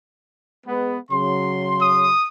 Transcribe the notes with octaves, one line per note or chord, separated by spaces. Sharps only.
G#3 B3
C#3 F#3 C6
D#6